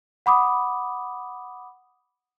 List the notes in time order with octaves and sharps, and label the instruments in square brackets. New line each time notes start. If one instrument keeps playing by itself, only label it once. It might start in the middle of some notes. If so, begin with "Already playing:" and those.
[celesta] F#5 B5 D6 D#6